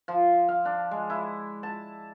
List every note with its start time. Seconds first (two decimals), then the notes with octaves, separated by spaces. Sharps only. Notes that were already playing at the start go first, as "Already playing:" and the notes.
0.08 F3
0.48 F5
0.65 D4
0.91 G#3
1.10 E4
1.63 A5